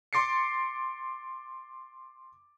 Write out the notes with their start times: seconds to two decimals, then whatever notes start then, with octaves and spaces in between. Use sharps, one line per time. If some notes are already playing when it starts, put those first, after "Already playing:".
0.13 C6 D6 A6 C7 C#7